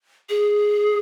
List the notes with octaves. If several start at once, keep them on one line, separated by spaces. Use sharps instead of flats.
G#4